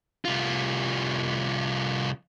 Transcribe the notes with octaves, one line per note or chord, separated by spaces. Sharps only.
C2 F4